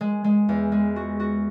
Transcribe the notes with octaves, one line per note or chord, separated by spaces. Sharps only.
G#3
G#3
E2
G#3
F#4
F#4